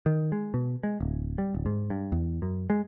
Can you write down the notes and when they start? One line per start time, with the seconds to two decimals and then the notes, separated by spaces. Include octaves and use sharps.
0.06 D#3
0.32 G#3
0.54 B2
0.83 G#3
1.00 D1
1.38 G3
1.54 D1
1.66 G#2
1.90 G2
2.12 E2
2.42 F#2
2.70 G#3